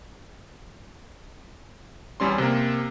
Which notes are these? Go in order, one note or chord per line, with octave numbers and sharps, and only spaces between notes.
E2 G3 C#4 C6
C3 A#3